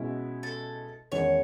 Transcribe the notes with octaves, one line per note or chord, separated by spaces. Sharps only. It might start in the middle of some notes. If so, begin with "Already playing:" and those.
Already playing: B2 G#3 C#4 E4
A4
E2 D#3 G#3 C#4 C#5